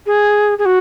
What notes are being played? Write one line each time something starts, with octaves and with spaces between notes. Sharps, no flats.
G#4
G#4
F#4